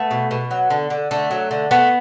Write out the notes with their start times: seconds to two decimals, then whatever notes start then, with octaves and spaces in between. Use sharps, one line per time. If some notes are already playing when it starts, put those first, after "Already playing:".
Already playing: A3 B3
0.11 B2
0.31 B2
0.51 F#3
0.70 D3
0.90 D3
1.11 D3 A3
1.31 F#3
1.51 D3
1.71 A3 B3